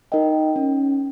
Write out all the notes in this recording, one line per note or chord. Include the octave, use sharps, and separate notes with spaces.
D#4 A#4 D#5 G5
C#4